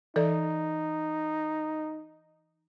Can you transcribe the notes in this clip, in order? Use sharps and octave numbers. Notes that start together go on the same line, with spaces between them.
E3 D#4 A4 D5